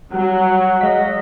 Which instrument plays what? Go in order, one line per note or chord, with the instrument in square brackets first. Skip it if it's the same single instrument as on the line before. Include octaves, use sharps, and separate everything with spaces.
[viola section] F#3 [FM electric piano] G3 [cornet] F#5
[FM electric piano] G#3 F5 B6 [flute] D#5